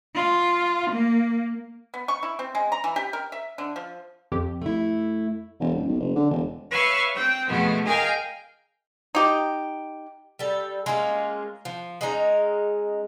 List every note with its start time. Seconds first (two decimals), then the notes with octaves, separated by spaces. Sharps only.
0.15 F4
0.91 A#3
1.94 B3
2.08 C#6
2.23 E4
2.39 C4
2.55 G#3
2.72 A#5
2.84 E3
2.96 G4
3.13 A#4
3.32 E5
3.58 D3
3.76 F3
4.32 F2 G4
4.62 A3 E4
5.60 E1
5.75 D#1
5.87 B1
6.00 F#1
6.16 D3
6.30 E1
6.70 B4 C#5 E5 F5 C#6
7.13 C4 G5
7.48 F2 B2 G#3 A3 B3
7.85 G#4 A#4 D#5 F5 G5 G#5
9.15 D#4 G4
10.39 G3 A4
10.86 G#3 A#3 C#4 F4
11.65 F3
12.01 G#3 C#4 D#4 A#5